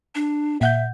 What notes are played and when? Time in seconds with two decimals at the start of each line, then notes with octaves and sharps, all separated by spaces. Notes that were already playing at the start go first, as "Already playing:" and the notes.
0.15 D4
0.61 A#2 E5 F#5 G6